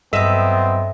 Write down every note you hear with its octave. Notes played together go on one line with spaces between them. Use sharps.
G2 F#3 B3 C4 A4 D#5 E5